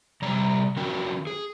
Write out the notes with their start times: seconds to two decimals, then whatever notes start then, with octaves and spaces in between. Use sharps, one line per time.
0.22 C3 G3 D5 A#5
0.76 D#3 C#4 F#4 A#4 G5
1.27 G#4